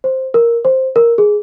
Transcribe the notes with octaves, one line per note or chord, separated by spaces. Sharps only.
C5
A#4
C5
A#4
G#4